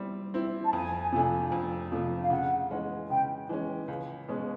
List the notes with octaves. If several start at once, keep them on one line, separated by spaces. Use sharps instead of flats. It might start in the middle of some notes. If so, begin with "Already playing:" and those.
Already playing: G3 C4 E4
C4 E4
A5
F2 G#5
C3 F3 A3 D4
F2
C3 F3 A3 D4
F5
C#3 F#5
E3 G#3 C#4
C#3 G5
E3 G#3 C#4
C#2
B2 G#3 C#4